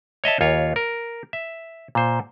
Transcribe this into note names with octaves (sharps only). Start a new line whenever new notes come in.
C#5 D#5 E5 A5
D#2 F4 C#5
A#4
E5
A#2 C5